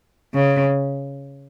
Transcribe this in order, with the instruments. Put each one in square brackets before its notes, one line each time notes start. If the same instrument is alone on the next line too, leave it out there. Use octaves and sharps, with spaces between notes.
[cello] C#3